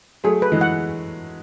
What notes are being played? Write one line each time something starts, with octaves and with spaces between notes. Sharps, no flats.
F#3 A3 G#4
B4
E3 G#3
F#5